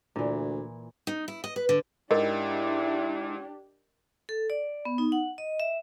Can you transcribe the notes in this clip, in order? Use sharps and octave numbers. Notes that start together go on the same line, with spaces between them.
D2 A#2 E3
D#4
E4
D#5
B4
D3
G#2 D4 E4 G4 A#4 D#5
A4
D5
B3
D#4
F#5
D#5
E5